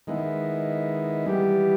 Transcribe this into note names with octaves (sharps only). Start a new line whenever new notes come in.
D#3 G#3 B3 E4
E3 G3 B3 G4